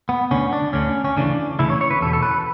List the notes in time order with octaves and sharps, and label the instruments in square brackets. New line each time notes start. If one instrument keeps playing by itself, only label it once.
[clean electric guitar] B3
D2 D3 C#4
D4
D2 D3 C#4
C#4
D2 C#3 E3 D4
D2 C#3 E3 E4
C#5
C#5
B4
E2 A4
B2
A4
B4